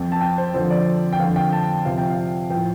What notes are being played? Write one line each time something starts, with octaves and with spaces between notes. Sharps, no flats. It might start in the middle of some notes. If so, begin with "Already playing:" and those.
Already playing: F2 F3 G5
A5
G5
C5
F2 D3 F3 C5
D5
G5
F2 D3 F3 F5
G5
A5
F2 C3 F3 F5
G5
F5
A2 F3 G5